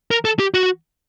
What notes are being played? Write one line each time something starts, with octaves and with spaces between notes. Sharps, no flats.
A#4
A4
G4
F#4